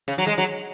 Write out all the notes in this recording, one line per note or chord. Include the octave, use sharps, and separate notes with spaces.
C#3
F#3
G#3
F#3